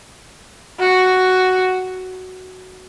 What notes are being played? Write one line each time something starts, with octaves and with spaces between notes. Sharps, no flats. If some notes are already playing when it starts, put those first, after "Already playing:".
F#4